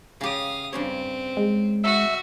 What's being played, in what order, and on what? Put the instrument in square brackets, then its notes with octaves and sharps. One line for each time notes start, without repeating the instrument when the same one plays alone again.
[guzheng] C#3 G4 [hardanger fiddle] F5 D#6
[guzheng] G2 C#3 C#5 [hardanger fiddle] C4
[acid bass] G#3
[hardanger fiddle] F#4 [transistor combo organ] E5